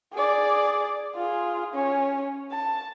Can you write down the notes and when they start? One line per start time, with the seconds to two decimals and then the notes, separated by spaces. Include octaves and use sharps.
0.13 G#4 D5
1.16 F4 G#4
1.74 C#4
2.52 A5